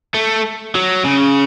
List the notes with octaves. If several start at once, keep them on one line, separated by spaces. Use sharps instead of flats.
A3
F#3
C#3